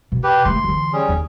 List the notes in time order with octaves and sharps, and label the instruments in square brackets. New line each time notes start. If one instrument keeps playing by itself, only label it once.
[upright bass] B2
[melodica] G4 B4
[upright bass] G#3 A3 [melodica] C6
[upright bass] D3 E3
[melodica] G3 C#4 G#4
[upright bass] D#2